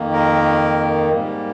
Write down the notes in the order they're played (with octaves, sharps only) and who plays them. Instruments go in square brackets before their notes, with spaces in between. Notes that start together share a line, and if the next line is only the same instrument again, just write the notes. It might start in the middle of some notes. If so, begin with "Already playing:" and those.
Already playing: [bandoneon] F2 D#3 A#3
A#4
G#2 G3 A#3